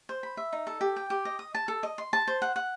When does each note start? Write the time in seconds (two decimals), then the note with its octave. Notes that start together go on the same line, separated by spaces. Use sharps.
0.09 C5
0.23 B5
0.37 E5
0.53 D#4
0.67 A4
0.81 G4
0.96 G5
1.10 G4
1.25 D#5
1.39 D#6
1.55 A5
1.68 A4
1.83 D#5
1.98 C6
2.13 A5
2.28 C5
2.42 F#5
2.56 F#5